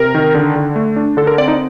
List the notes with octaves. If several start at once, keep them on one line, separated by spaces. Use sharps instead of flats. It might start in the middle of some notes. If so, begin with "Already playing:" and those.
Already playing: C3 A#4
D#3
D3
D3
A3
D4
D3 A4
A#4
C4 D5
D#4